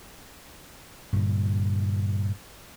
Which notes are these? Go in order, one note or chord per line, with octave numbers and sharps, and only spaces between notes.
G2 A#2 D3